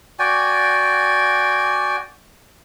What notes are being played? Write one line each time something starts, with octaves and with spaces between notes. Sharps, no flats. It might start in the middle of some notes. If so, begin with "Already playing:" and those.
F#4 D5 G5 G#5